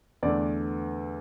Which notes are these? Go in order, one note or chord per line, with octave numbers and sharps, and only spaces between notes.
E2 D3 A3 D5